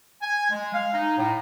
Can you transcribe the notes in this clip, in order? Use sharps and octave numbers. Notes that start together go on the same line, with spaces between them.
G#5
G#3
F5
D#4
A2